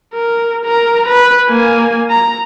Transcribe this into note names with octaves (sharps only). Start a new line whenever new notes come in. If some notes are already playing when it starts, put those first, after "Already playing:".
A#4
A#4 A#5
B4
A#3 G#5
A#5